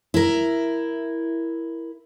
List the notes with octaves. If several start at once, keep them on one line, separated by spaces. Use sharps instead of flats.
E4 A#4